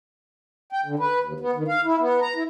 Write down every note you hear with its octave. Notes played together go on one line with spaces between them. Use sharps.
G5
D3
B4
D#2
B3
D#3
F5
E4
B3
A#5
E4